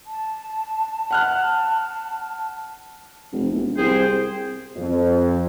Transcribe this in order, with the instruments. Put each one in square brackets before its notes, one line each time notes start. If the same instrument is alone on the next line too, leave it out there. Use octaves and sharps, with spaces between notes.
[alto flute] A5
[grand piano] F#5 F6 F#6
[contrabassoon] F1
E1
[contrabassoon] C2 [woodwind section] G#4 C5 G5
[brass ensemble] F2